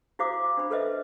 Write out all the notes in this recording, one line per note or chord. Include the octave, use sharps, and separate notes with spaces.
E4 F#4 C5 F5 D6 D#6
D4 C5 B5
A4 B4 C5 D#5 E5